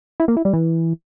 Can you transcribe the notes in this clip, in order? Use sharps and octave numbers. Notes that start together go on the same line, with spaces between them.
E4
A#3
E4
G3
E3